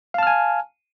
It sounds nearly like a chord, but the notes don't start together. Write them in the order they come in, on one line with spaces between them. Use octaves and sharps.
F5 A5 F6 G#5